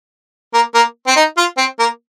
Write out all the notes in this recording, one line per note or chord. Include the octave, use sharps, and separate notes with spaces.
A#3
A#3
C4
D#4
F4
C4
A#3